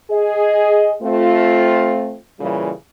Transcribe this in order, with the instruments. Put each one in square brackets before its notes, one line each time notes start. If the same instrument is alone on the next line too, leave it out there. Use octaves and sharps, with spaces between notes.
[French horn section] G#4 D#5
A3 C4 F4
A#2 C#3 E3 G3